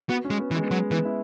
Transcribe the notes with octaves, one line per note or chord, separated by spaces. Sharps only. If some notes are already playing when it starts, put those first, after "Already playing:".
B3 F#4
C#4
G#3
B3
E3
G#3
B3
F#3 G#3
E3 B3
E4